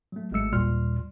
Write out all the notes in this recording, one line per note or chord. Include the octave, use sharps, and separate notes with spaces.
F#3 A3
G#1 G#3 A3 E6 C#7
D#2 A#2 G3 D5 C6 F6